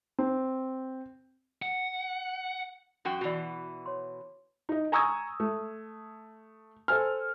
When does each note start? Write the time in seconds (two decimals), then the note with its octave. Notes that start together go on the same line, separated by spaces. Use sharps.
0.19 C4
1.62 F#5
3.05 F#2 F#4 G5
3.21 B2 E3 F#4 D5
3.86 C#5 C6
4.69 D#4 D#5
4.92 G#5 A#5 C#6 D#6 E6 G#6
5.40 A3
6.88 A4 C5 G#5 F6